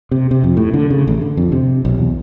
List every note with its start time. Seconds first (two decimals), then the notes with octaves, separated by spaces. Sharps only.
0.11 C3
0.31 C3
0.44 F2
0.57 A2
0.74 D3
0.90 C#3
1.07 A1
1.21 D3
1.37 F2
1.52 C3
1.85 B1
1.98 E2